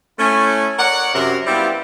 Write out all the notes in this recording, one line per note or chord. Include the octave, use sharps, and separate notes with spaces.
A3 C#4 E4
A#4 C#5 D5 F#5
F#2 C3 A#4
G3 B3 C4 E4 F4 G4